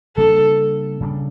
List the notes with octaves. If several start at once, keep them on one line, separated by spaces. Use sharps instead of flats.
C#3 G3 A#3 D4 A4
C#3 G3 A#3 D4